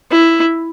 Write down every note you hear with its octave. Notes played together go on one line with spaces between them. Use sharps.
E4